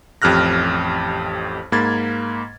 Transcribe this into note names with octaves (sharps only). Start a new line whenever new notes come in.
A1 F2 G4 F6 F#6 A#6
G#2 A#3 B5 G#6 A6